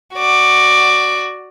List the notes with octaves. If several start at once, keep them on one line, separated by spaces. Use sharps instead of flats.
F#4 D5